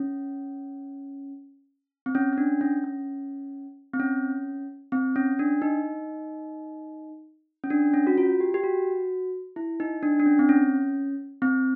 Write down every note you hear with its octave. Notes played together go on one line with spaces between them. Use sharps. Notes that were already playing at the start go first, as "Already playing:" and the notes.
Already playing: C#4
C4
C#4
C#4
D4
C#4
C#4
C4
C#4
C4
C#4
D4
D#4
C#4
D4
C#4
F#4
F4
G4
G4
F#4
E4
D#4
D4
D4
C#4
C4
C#4
C4